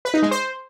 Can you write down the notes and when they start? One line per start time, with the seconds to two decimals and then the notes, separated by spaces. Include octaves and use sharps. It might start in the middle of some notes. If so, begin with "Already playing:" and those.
0.05 B4
0.14 D#4
0.23 G#3
0.31 C5